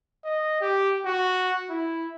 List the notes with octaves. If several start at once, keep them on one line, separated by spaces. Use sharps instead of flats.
D#5
G4
F#4
E4